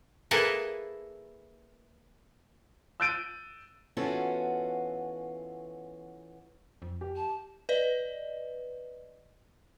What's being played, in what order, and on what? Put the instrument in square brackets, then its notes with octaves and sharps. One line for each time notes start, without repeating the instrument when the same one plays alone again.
[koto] A#3 E4 G#4 A4 B4
[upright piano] E6 F#6 G6 A6 D7 D#7
[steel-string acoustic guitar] E3 B3 C#4 F4 F#4 A4
[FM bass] F2
[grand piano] G4
[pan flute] A5
[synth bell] B4 D5 D#5